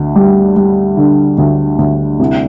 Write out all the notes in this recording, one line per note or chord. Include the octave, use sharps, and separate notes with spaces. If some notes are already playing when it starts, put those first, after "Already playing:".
Already playing: D2
G3
G3
D3
D2
D2
C2